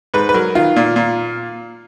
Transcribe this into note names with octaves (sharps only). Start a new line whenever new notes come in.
G#2 B4
B4
F#3 A#4
D#3 F4
A#2
A#2